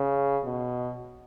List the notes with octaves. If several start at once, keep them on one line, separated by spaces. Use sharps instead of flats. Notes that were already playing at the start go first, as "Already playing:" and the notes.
Already playing: C#3
B2